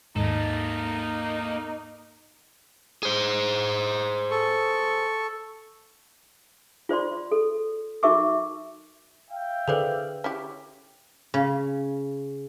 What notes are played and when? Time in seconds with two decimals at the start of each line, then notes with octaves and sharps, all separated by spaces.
0.16 D#2 G#2 A#3 D#4 A4
3.03 G#4 C5
4.31 A4 C#6
6.89 F4 C5 D5 C6
7.31 A4
8.03 D#4 F#4 A#4 E5 C#6 D6
9.30 E5 F5 G5
9.68 D3 E3 G#4 A4 B4 C5 D5
10.24 C#4 E4 G4
11.34 C#3